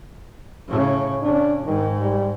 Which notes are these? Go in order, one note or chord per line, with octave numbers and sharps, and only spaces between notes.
A2 C#3
C#3 D4
G#2 D#3
G3